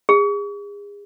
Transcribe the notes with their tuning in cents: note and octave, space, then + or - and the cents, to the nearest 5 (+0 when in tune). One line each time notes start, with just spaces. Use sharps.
G#4 -35